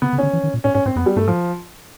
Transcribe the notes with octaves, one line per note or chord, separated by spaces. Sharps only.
C#3 B3
C#3
D3 C#4
E3
D#3
A#2
A2 C#4
G#2 C#4
G#2 C4
F2 B3
G3
G2 A3
G#2 F3